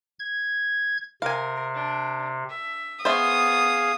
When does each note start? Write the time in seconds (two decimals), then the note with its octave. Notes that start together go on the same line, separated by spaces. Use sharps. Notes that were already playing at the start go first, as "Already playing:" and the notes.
0.19 G#6
1.22 C3 A#4 F5 G#5
1.74 D4
2.49 E5
3.05 B3 G#4 C5 D5 E5 F5 C#6 D#6